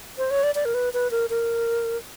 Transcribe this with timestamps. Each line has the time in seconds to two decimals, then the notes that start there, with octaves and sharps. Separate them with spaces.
0.18 C5
0.31 C#5
0.43 D5
0.55 D5
0.65 A#4
0.74 B4
0.94 B4
1.11 A#4
1.30 A#4